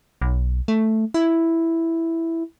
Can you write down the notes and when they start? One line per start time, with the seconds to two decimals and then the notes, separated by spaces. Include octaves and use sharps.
0.22 B1
0.68 A3
1.14 E4